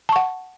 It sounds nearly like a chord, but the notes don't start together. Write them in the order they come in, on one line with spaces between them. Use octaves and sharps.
A5 C#6 F#5